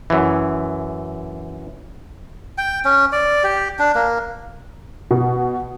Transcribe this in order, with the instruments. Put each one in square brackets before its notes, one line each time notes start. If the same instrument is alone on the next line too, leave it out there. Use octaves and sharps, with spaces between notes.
[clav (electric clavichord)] F#2 E3
[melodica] G5
C#4
D5
G4
D4
A#3
[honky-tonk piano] B2